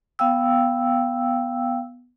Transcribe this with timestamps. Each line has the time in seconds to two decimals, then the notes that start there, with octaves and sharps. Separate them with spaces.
0.19 B3 F5 G5 E6